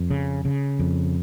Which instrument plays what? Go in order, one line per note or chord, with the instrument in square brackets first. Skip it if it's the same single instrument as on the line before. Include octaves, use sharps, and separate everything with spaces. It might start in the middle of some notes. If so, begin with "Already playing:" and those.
Already playing: [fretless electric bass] F2
C#3
C#3
F2